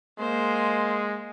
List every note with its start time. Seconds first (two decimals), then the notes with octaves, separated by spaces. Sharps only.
0.19 G#3 A#3 C5